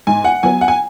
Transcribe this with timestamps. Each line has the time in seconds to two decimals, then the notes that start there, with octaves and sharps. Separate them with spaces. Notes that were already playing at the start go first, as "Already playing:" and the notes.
0.07 G#2 G#5
0.24 F#5
0.43 F#3 B3 G#5
0.61 F#5
0.68 G#5